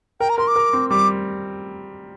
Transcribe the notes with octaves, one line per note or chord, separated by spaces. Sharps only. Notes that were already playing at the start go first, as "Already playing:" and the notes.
A#4 G5
A#5
A#4 C6
D6
A#4
C4
G3 D6